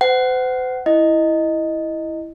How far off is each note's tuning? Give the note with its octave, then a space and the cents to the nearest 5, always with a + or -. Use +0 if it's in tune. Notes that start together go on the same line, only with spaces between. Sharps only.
C5 -40 F#5 +20
E4 +0 D#5 +0